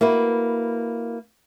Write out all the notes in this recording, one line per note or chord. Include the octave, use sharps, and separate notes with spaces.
A#3 E4 F#4 B4